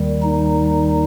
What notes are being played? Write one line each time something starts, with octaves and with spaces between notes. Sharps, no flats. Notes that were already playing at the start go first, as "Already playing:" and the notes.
Already playing: D#2 D#3 G3
D#4